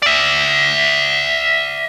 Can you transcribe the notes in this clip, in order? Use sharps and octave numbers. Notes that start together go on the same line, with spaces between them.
D5 E5